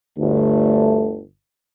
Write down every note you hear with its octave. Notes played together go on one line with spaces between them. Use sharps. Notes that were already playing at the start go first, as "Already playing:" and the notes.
G1 D2 A3